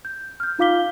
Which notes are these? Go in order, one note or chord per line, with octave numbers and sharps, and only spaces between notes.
G6
F6 G6
D#4 F4 F5 D6 B6 G7